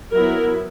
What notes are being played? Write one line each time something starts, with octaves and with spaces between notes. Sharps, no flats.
F#3 B3 E4 A#4